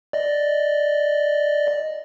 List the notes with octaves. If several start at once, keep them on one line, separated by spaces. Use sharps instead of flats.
D5 D#5